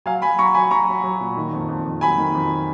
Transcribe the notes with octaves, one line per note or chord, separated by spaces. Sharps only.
F#3 F5 G#5
F#3 G#5 B5
F#3 A#5 C#6
F#3 G#5 B5
F#3 A#5 C#6
F#3
F#3
A#2
D#3
F2
F2
F2
F#3 G#5 B5
D#3
F2